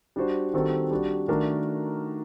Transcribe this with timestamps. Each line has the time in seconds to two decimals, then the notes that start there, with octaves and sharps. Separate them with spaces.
0.16 G3 D4 F#4 C5
0.54 D#3 G3 C4 F#4 A4
0.91 G3 D4 F#4
1.28 D#3 A3 D4 F#4 A#4